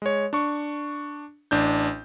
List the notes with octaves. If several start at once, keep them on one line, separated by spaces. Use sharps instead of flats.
G#3 C#5
D4 C#6
A1 D4 G6